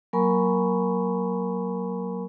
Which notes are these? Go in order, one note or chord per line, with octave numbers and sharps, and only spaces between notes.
F#3 A#3 A#4 G#5 B5 C#6